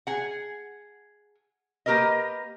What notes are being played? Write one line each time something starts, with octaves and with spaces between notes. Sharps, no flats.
G#4 F#5
A#3 G4 A#4 B4 D#5